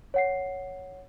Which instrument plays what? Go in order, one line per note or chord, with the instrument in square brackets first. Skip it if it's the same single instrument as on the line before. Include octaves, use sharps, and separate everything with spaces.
[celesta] C#5 F#5 C7